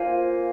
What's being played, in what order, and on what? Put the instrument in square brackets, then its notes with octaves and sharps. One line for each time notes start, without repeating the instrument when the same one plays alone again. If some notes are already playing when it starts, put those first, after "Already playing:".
Already playing: [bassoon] A#3 [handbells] F4 C5 F5 G#5